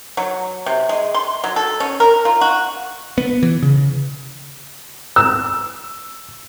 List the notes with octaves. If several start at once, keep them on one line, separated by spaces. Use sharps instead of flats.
F#3
C3
G#3
C6
F#3
A4
C#4
A#4
F4
F#4
B3
E3
C#3
E6